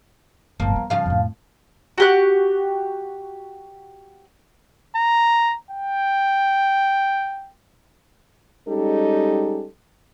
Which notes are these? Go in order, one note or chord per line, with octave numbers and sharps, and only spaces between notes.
G1 A2 F3 A#3
B3
C#3 F3 F5
F2 A2
F#4 G4 F#6
A#5
G5
G3 G#3 C#4 D#4 G4 A4